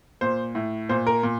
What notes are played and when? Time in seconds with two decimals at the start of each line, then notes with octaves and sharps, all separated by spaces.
0.21 A#2 C5
0.55 A2
0.89 A#2 C5
1.07 A#4
1.23 A#2